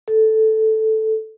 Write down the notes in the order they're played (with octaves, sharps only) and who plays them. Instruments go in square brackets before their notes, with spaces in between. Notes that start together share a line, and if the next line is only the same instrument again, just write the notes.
[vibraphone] A4